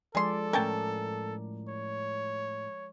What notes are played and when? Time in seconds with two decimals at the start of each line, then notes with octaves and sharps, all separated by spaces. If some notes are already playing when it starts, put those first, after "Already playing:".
0.15 F3 G#3 G#4 A4 D5 C6
0.53 A2 C#4 A#4 G5 A5
1.69 C#5